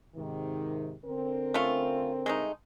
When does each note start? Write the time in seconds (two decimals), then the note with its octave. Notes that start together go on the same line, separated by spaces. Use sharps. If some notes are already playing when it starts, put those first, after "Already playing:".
0.16 G#2 C3 D#3
1.05 D3 C4 A#4
1.54 A3 C#4 F4
2.26 G#3 A3 D#4